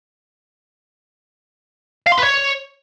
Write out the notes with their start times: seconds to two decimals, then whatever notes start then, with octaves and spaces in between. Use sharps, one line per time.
2.07 F5
2.12 C6
2.18 B4
2.23 C#5